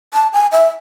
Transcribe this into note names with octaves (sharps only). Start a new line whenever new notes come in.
A5
G#5
E5